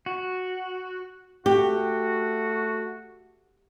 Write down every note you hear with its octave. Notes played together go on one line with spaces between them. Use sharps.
F#4
A3 F#4 G4